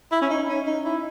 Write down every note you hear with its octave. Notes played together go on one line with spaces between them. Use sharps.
E4
C#4
D#4
C#4
D#4
E4